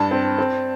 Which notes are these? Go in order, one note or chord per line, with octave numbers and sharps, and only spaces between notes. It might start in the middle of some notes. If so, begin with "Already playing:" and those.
Already playing: G2 A5
C4
C4